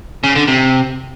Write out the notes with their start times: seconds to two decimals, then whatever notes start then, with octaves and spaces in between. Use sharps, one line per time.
0.24 C#3
0.36 D3
0.48 C3